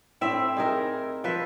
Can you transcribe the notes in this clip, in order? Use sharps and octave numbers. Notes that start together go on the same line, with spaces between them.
A2 C4 E4 E5
D#4 G#4 A#4
F3 B4 E5